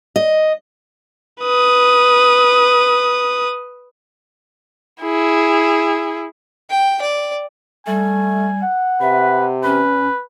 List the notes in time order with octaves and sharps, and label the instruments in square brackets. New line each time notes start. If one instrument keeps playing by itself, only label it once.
[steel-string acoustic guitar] D#5
[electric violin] B4 D#6
[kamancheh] E4 G#4
[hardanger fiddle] G5
D5
[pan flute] G3 [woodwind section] A3 [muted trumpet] G#5
[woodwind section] F#5
[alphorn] C3 [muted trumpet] B4 [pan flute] E5
[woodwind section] E2 [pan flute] C#4 [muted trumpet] B4